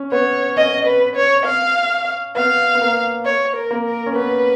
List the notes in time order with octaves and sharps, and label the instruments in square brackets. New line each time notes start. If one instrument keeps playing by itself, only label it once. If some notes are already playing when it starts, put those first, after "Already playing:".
Already playing: [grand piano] C#4
[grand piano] B3 [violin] C#5
[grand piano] C#4 [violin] D#5
[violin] B4
C#5
F5
[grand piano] B3 [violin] F5
[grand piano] B3
A#3
[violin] C#5
A#4
[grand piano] A#3
[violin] A#4
[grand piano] C#4
[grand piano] B3 [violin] B4